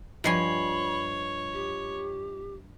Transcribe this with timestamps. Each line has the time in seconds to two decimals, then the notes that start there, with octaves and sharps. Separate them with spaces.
0.24 G2 F3 F4 C#5 D#5 G#5 B5 C7
1.53 G4